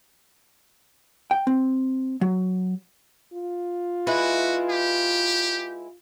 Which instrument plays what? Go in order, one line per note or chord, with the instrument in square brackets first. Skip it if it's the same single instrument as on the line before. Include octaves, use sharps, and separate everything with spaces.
[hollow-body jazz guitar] G5
C4
F#3
[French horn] F4
[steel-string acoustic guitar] G#3 E4 B4 [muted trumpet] F#4
[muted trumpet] G4